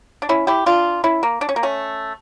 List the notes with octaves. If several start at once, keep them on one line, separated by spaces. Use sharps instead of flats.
D4
C#4 E4
E4 G4
D4 F4
C#4 E4
A#3
D4
C#4
A#3
A3 C#4